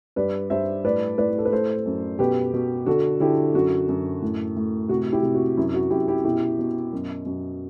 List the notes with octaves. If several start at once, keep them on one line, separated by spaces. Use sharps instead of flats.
G2 B4 D5
G2 C5 E5
A2 B4 D5
A2 B4 D5
A4
B4
A3 A4 C5
F#2
B2 G4 B4
B2
D3 F#4 A4
D3 E4 G4
F#2 F#4
F#2
A2
A2
C3 F#4
E4 G4
C3
F#4
F#2 E4
F#4
F#2 E4 G4
E4 G4
B2 E4 G4
B2
F#2
F#2